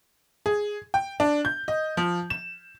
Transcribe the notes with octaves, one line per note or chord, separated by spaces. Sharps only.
G#4
G5
D4
G6
D#5
F3
E7